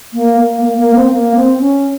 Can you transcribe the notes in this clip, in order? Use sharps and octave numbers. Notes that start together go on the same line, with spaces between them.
A#3
A#3
A#3
A#3
C4
A#3
C4
C#4